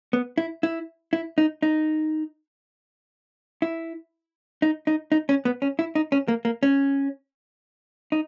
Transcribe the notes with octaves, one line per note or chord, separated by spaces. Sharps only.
B3
E4
E4
E4
D#4
D#4
E4
D#4
D#4
D#4
C#4
B3
C#4
E4
D#4
C#4
A#3
A#3
C#4
D#4